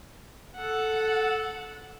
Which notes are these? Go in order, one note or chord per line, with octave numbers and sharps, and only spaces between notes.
A4 F#5